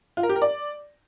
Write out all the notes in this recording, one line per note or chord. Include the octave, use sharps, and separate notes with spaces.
F4
A#4
G4
A#4
D5